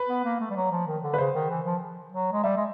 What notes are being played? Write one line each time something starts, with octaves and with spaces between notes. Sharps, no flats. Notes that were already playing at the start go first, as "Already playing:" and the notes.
Already playing: B4
B3
A#3
A3
G3
F#3
F3
D#3
D3
B4
C#3 C5
D#3
E3
F3
F#3
G#3
G3 E5
G#3